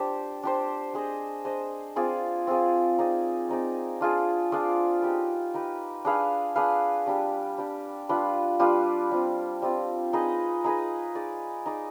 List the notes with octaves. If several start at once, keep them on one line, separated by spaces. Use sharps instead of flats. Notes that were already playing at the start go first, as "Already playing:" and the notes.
Already playing: D4 G4 C5
D4 G4 C5
D4 G#4 C5 D#5
D4 G#4 C5 D#5
C4 F4 G#4 D5
C4 F4 G#4 D5
C4 D#4 G#4 D5
C4 D#4 G#4 D5
D4 F4 G#4 D5
D4 F4 G#4 D5
D#4 G4 B4
D#4 G4 B4
D4 G#4 B4 F5
D4 G#4 B4 F5
G3 D4 G4
G3 D4 G4
G3 D4 F4 B4
G3 D4 F4 B4
G3 C4 F4
G3 C4 F4
D#4 G#4 B4 D#5
D#4 G#4 B4 D#5
D#4 G#4 D5
D#4 G#4 D5